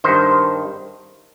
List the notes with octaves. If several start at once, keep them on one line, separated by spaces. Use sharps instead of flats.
G2 D#3 C5